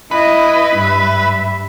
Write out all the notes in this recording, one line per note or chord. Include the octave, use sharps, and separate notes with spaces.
E4 B4 D#5
G2 E5